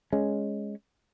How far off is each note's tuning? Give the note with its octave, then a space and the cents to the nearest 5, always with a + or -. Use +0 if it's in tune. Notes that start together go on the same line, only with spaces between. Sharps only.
G#3 +0 C#4 +0